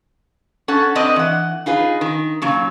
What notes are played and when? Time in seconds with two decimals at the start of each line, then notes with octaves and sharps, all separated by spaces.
0.68 C#4 A4 F#5
0.95 C4 D4 B4 D5 D#5
1.16 E3 F#5
1.66 D#4 F4 G#4 B4
2.01 D#3
2.42 A#2 C#3 F#3